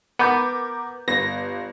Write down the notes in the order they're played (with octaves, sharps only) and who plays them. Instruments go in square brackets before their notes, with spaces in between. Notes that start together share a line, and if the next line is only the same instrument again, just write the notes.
[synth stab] B3 [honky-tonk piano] A#4 D6 G6
[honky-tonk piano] G1 [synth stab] A#6